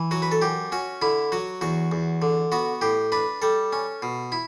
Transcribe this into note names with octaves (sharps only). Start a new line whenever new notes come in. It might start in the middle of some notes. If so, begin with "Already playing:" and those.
Already playing: E3
F#3 F#4
B4
A4
F#2 G4
C#4 F#4
D3 E4
F#3 F#4
E2 F#4
E2
D3
B3 F#4
A2 G4
D4 B4
G3 A4
C#4
B2
E4